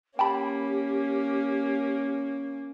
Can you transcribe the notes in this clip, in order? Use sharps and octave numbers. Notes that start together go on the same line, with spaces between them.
A#3 C#4 G4 G5 A5 B5